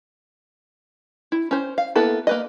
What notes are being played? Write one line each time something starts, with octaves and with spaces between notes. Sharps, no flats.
E4
C#4 C5
F5
A#3 B3 E4 A4 B4
A#3 B4 D#5